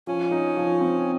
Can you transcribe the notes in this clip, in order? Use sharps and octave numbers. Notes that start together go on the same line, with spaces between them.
F3 C#4
D#4
F3
C4